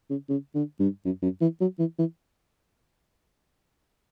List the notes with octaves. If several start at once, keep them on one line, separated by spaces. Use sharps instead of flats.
C#3
C#3
D3
G2
F#2
F#2
E3
F#3
E3
E3